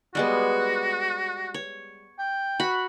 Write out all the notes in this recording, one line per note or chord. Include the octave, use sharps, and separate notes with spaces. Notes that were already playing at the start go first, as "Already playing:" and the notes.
G3 G#3 B3 F#4
C#5
G5
F#4 B5